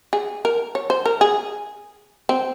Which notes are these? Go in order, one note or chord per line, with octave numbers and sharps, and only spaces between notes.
G#4
A#4
C#5
C5
A#4
G#4
C4